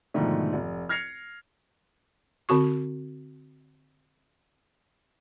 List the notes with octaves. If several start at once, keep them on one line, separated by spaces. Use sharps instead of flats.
G#2 B2 D3 D#3 F3 A3
F1
F6 G#6 A#6 C7 C#7 F7
D3 C4 F#4 C#6